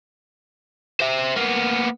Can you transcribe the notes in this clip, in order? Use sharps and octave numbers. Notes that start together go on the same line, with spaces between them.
C5 E5
A#3 B3